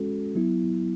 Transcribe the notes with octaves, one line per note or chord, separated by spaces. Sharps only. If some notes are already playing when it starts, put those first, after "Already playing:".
Already playing: G#3 C#4 F#4 A4
F#3 B3 E4